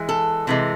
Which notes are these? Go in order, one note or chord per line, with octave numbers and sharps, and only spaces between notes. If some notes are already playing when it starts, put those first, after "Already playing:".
Already playing: E3 G#3
A4
C3 E3 G#3